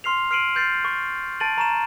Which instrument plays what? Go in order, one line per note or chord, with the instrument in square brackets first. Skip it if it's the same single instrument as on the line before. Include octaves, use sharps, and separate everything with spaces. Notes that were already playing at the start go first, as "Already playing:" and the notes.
[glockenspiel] C6 F6 C7 F7
F6 C7 D7 D#7 F#7
F6 G6 A6 C7
C#6
A5 A6 D7 D#7 F#7
A#5 C#6 E7